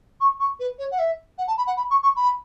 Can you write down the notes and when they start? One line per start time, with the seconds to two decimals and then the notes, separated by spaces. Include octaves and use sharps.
0.20 C#6
0.40 C#6
0.59 B4
0.78 C#5
0.91 F#5
0.98 E5
1.38 F#5
1.47 A5
1.57 B5
1.67 F#5
1.77 B5
1.90 C#6
2.02 C#6
2.16 B5